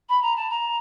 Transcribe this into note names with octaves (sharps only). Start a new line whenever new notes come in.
B5
A#5
A5
A#5